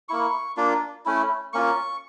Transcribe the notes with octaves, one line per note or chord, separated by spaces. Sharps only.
A#3 E4 C#6
A#3 D4 F4
A3 C#4 E4
A#3 C#4 F4 C#6